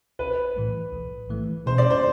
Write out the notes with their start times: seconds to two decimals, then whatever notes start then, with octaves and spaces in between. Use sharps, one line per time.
0.19 B1 B4
0.56 A2 E3 A3
0.92 B1
1.29 A2 E3 A3
1.66 B2 C5
1.78 D5
1.90 C5